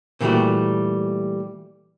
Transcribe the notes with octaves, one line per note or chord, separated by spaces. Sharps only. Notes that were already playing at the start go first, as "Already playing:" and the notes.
A#2 D3 E3 G3 A3 F#4